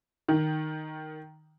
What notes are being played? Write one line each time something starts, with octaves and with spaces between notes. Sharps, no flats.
D#3